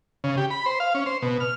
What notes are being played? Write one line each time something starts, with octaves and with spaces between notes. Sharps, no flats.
C#3
G4
B5
C5
F5
C#4
C5
B2
F6